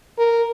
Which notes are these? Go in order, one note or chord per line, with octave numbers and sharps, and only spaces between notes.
A#4